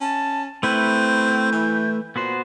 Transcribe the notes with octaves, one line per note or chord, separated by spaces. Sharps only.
C#4 A5
A3 C4 E4 B4 G6
E3
A#2 B3 F#4 C5